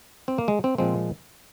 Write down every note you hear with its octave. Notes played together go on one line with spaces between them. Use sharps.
C4
A#3
G#3
C4
A#2 F3 G#3 C4